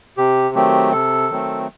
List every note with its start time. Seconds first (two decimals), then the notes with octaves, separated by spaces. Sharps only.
0.17 C3 G4
0.55 D#3 F#3 A3 C4 G4
0.92 C3 A4
1.30 D#3 F#3 A3 C4